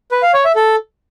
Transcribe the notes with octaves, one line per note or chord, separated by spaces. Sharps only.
B4
F5
C#5
E5
A4